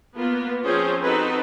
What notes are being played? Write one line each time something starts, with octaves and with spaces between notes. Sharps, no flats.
A#3 B3 F4
F3 C4 C#4 F4 G#4 C5
C4 D#4 F#4 A4 B4